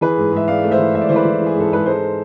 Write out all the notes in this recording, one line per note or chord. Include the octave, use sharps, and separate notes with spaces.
E3 G#4 B4
G#2
G#2 E5
G#2 D5 F5
A3
C5 E5
E3
G#2 E5
D5
E3 C5
B4 D5
E3
E3
G#4
G#2 A4
G#2 B4
G#3 A4 C5